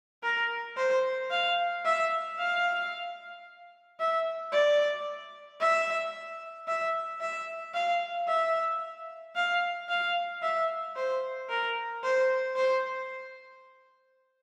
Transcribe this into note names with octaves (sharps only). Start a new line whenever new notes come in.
A#4
C5
F5
E5
F5
E5
D5
E5
E5
E5
F5
E5
F5
F5
E5
C5
A#4
C5
C5